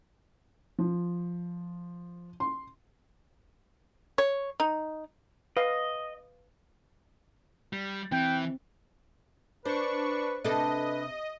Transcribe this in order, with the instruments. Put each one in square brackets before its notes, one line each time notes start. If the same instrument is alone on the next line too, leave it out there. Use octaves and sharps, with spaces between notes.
[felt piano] F3
C6
[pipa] C#5
D#4
[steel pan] B4 F5 [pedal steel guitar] D#5
[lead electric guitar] G3
[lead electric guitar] E3 [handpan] C4 [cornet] G5
[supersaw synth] D4 C#6 [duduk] B4 [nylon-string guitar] C5
[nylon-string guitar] C3 [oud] D4 A4 [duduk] B4 [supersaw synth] D#5